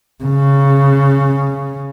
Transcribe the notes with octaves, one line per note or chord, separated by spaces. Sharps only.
C#3